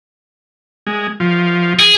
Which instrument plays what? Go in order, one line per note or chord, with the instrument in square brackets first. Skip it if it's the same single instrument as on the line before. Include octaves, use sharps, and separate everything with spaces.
[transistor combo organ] G#3
F3
[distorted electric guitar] G#4